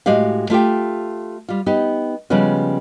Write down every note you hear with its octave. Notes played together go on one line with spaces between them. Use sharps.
A2 G#3 F#4 G4 F5
A3 F4 G4 G5
G3 F4
B3 D#4 G4
C#3 F3 G3 G#3 B3 C#4